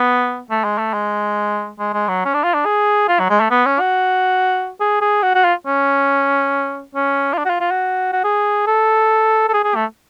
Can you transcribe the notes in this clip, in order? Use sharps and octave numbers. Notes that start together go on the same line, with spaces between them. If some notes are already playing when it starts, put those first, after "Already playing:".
Already playing: B3
A3
G#3
A3
G#3
G#3
G#3
F#3
C#4
D4
F4
D4
G#4
F4
F#3
G#3
A3
B3
C#4
F#4
G#4
G#4
F#4
F#4
F4
C#4
C#4
F4
D4
F#4
F4
F4
F#4
F#4
G#4
A4
A4
G#4
G#4
A3